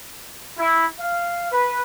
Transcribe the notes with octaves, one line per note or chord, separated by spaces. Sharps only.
E4
F5
B4